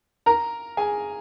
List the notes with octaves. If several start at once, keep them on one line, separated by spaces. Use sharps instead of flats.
A#4 A#5
G#4 G#5